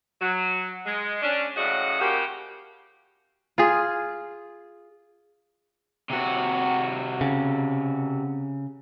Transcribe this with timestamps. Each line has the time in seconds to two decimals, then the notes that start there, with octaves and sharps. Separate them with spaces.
0.21 F#3
0.86 G#3
1.22 C#4 D4
1.56 F#2 A2 C#3 F#4 D#5 F#5
2.00 C#3 F3 A#3 F#4 G4
3.58 F4 G#4
6.10 C3 F#4
7.21 C#3